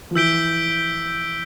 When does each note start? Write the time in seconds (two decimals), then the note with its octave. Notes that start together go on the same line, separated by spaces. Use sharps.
0.11 F3
0.15 E3 E6 G6 B6 D7 G7